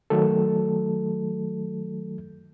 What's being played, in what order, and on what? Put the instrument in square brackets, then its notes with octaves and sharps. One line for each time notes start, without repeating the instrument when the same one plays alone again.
[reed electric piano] D#3 F#3 A3 A4